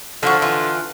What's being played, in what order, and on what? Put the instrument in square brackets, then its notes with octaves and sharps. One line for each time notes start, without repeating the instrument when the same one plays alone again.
[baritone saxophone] D3 [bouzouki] F3 F#4
[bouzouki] E3 F4